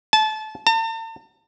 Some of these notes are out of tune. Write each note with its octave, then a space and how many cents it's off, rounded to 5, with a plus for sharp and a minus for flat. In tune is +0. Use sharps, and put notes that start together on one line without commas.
A5 -25
A5 +45